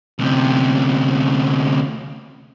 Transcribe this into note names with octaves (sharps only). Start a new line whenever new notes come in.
D2 C3